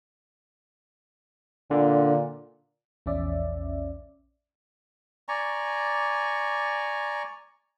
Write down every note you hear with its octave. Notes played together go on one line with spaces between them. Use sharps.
A#2 D3
A#1 E2 C#4 D5 E5
D5 G#5 A#5 C#6